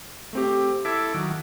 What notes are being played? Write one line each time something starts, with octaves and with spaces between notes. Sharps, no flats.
A3 C4 G4
E4 A4 D6 E6 G#6 B6
D#3 F#3